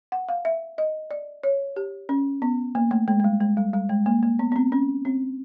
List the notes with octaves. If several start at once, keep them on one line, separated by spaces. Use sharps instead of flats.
F#5
F5
E5
D#5
D5
C#5
G4
C#4
B3
A#3
A3
G#3
G#3
G3
G#3
G3
G3
G#3
A#3
A#3
B3
B3
C4
C#4
C4